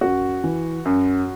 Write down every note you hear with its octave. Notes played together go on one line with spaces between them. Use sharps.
F#2 F#4
E3
F#2